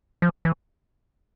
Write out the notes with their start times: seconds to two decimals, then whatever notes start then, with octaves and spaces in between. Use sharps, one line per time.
0.22 F3
0.45 E3